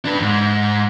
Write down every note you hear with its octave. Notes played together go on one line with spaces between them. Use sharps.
D4 B4
D#2 G#2